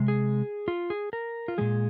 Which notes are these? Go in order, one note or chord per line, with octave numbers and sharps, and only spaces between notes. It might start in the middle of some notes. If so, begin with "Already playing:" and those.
Already playing: C3 G#3
G#4
F4
G#4
A#4
F4
A#2 F3 G#3 G#4